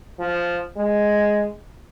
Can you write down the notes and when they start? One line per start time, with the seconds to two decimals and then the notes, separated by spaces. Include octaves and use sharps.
0.19 F3
0.77 G#3